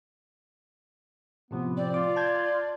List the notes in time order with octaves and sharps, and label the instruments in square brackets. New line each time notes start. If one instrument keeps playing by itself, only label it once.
[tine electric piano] A2 C3 F3 [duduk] B3
[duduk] C4 [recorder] D5
[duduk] F4 [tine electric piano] D6
[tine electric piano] A5 G6 G#6